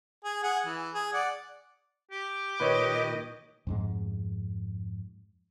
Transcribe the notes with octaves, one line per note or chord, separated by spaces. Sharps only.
G#4
G#4 F#5
E3
G#4
D5 F#5
G4
A#2 D#3 B4 C#5 D#5
F2 G#2 G#3